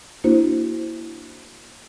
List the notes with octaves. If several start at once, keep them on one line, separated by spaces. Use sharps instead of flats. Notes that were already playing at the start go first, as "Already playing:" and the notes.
A#3 D4 E4 F#4 C5